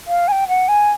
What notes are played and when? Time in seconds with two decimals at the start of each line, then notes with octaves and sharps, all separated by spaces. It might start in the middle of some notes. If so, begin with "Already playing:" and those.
0.07 F5
0.28 G#5
0.32 G5
0.48 F#5
0.68 G#5